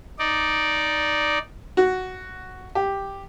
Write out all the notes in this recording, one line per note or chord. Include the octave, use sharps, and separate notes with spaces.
D#4 D5
F#4
G4